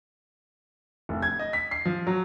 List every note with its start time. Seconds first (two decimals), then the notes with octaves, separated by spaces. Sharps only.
1.09 F1
1.22 G#6
1.39 D#5
1.53 B6
1.71 C7
1.85 F3
2.07 F#3